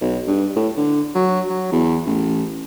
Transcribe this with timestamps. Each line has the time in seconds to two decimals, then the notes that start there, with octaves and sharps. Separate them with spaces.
0.01 B1
0.27 G2
0.56 A2
0.77 D3
1.15 F#3
1.49 F#3
1.72 E2
2.06 A1